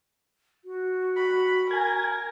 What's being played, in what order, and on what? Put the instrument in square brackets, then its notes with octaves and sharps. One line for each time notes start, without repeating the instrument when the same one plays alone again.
[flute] F#4
[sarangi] B5
[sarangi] A#4 [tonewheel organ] G#5